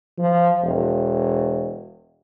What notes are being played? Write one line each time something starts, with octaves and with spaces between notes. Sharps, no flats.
F3
E1